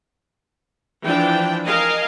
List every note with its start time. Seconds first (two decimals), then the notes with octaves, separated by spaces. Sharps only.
1.04 E3 F3 D4 G5
1.66 A#4 D#5 F5 G#5